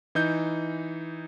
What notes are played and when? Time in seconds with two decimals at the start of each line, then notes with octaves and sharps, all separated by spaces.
0.15 E3 D#4 G6